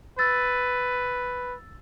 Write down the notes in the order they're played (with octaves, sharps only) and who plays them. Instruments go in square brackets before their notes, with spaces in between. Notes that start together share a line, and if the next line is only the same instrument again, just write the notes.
[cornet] B4 [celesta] E6 A6